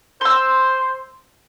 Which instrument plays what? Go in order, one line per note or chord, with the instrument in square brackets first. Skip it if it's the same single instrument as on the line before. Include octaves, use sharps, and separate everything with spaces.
[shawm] C5 [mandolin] C6 E6